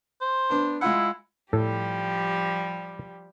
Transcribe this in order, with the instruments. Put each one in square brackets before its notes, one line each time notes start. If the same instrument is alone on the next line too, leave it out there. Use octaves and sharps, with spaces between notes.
[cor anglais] C5
[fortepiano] B3 D4
[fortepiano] G#3 F4 F#5 [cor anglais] E4
[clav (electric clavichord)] A2 A4 [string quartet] F3 G3 G4